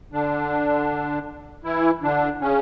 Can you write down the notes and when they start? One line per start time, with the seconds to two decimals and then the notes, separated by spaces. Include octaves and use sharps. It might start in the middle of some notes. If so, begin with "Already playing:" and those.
0.12 D3 D4
1.64 E3 E4
2.02 D3 D4
2.40 C#3 C#4